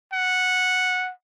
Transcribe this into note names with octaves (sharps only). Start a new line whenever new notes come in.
F#5